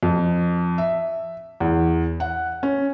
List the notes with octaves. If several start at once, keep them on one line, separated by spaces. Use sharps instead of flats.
F2
E5
E2
F#5
C#4